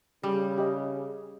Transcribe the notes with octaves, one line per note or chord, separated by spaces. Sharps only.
C#3 G3
G4 D#5